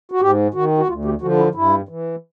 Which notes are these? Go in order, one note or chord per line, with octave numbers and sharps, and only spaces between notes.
F#4
G#2 G4
D#3 F#4
F#4
D2 F4
G4
D3 F3 F#4
E4
G2 E4
E3